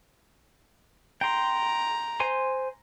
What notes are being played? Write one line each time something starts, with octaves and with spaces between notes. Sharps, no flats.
G5 A#5 C6
C5 G#5 C6